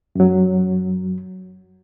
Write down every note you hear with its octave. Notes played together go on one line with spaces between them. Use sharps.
F#2 F#3